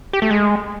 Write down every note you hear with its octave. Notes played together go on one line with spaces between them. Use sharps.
G4
A3
G#3